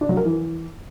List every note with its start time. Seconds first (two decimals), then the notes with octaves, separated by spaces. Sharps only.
0.01 D4
0.09 F#3
0.17 A#4
0.25 E3